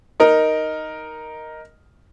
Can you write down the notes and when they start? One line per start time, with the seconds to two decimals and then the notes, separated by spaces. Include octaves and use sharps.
0.20 D#4 A#4